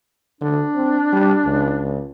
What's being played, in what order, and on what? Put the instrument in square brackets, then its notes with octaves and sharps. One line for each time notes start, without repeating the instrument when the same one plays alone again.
[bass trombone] D3 [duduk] D4
[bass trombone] C4
G3
C#2